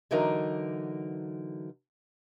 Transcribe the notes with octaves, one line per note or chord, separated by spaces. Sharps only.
D3 E3 F#3 D#4 A#4